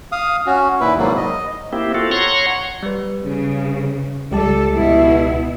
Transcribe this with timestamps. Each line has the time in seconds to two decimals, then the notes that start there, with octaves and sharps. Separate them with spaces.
0.12 F5 D#6
0.46 C#4 F#4
0.80 D#2 A#2 E4 B4
0.98 G#2 C3 F#3 G3 A#3
1.17 D#5
1.73 A#3 C4 E4 G4
1.94 C4 F4 F#4 A4
2.11 C#5 F#5 A#5 C6 C#6
2.83 G3 B4
3.24 C#3
4.31 C#2 G3 G4 A4 A5
4.74 B2 B3 E4